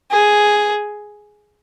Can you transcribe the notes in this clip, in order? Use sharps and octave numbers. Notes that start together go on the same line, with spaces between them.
G#4